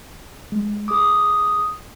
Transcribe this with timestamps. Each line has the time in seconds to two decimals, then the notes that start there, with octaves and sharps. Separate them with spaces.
0.52 G#3
0.88 G#4 D6 D#6